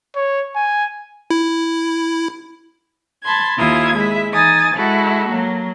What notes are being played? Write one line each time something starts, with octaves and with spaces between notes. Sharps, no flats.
C#5
G#5
E4
A5 B5 C6 G#6
D#2 E4 F4 D#6 G#6
G#3 E4 E5
E3 D#4 G#5 D#6 A6
G#3 E4 F#4 A4
F#3 A#3